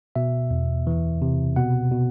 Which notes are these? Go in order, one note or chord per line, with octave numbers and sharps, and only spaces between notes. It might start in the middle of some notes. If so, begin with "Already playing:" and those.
B2 E5
E2
E3
C3
B2 F#5
B2